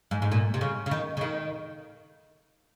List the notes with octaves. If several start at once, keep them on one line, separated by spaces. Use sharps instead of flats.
G#2
G#2
A#2
C3
C#3
C#3
D#3
C#3
D#3